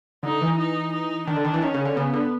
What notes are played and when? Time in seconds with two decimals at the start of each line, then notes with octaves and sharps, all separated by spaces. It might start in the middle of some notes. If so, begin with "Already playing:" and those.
0.23 D3 D#4
0.42 E3
0.58 D#4
0.93 D#4
1.27 D#3 D4
1.36 D3
1.45 D#3
1.54 E3
1.62 D#3 C#4
1.74 C#3
1.85 D3
1.96 C#3 B3
2.13 D3